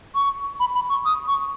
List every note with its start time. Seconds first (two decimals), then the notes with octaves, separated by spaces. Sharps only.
0.15 C#6
0.60 B5
0.75 B5
0.89 C#6
1.05 D#6
1.28 C#6